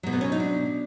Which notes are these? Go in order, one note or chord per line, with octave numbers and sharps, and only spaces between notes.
B2 F#3
B3
C#4
D#4
D4